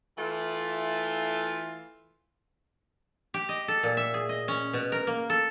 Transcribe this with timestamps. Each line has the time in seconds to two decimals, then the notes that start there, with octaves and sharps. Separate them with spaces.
0.17 E3 A3 E4 F4
3.34 G4
3.49 D#5
3.68 A4
3.83 A#2
3.97 E5
4.14 G#4
4.29 D#5
4.48 C#4
4.73 B2
4.92 A#4
5.07 A#3
5.30 A4